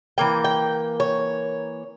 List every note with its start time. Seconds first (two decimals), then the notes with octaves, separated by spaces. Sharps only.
0.18 E3 A#3 G5
0.45 G5
1.00 C#5